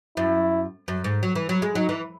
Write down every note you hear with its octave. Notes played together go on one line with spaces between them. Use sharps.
F#2 E4
F#2
G#2
F#3
E3
F#3
G#3
F#3 D#4
E3